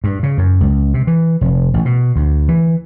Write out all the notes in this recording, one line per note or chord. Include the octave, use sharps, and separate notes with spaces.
G2
C#3
F#2
C#2
C3
E3
F1
A1
B2
D2
E3